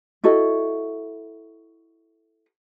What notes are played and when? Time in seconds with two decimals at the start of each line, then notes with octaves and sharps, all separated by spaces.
0.24 E4 F#4 A4 D#5